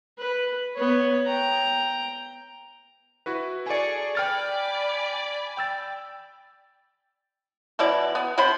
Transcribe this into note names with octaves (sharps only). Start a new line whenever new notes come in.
B4
B3 C#5
G5 A#5
E4 F#4 B4
G#4 A4 D5 G#5 C#6
D5 G5 G#5 B5 F6 A6
G5 E6 A6
B2 E3 E4 D5
B3
C3 C4 C5 B5